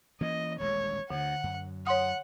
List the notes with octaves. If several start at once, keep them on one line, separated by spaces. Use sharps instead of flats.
E3 A#3 C#4 D#5
D#1 A1 G#3 C#5
D2 D3 F#5
F#2
C#5 F#5 C6 D#6